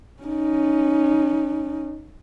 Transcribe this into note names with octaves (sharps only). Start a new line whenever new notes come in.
C#4 D#4